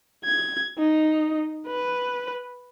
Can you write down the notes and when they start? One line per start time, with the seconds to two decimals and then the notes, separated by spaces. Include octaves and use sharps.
0.25 G#6
0.79 D#4
1.67 B4